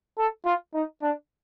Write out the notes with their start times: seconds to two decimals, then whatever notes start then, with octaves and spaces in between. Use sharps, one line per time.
0.18 A4
0.45 F4
0.74 D#4
1.02 D4